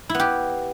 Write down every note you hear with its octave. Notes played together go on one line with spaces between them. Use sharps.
E4
B3
G4